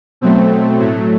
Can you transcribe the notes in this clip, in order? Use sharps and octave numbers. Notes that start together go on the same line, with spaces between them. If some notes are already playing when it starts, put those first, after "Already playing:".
B2 F#3 A3 C4
A2 F#3 A3